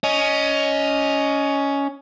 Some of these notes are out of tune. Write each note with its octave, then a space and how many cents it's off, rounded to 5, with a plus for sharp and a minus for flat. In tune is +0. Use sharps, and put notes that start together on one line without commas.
C#4 +15 D#5 +0